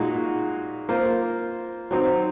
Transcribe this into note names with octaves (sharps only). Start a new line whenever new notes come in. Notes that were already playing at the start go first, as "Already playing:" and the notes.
Already playing: A#2 G#3 D#4 F#4
A#3 F4 C5
F#3 C4 D#4